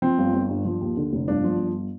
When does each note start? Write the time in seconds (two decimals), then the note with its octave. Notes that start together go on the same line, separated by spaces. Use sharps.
0.02 F3 C4
0.18 G1
0.34 G1
0.50 G2
0.65 F3
0.81 D#2
0.97 D3
1.13 F1
1.28 G1 D4
1.44 F3
1.60 G1